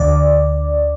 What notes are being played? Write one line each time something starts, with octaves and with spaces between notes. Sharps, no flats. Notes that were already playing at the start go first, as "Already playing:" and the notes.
Already playing: D2 D3 D5